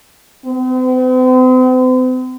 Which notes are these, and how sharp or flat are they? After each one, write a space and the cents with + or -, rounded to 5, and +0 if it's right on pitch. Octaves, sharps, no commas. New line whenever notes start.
C4 -45